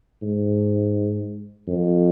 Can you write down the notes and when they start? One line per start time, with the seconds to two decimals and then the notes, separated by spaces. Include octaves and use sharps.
0.23 G#2
1.68 F2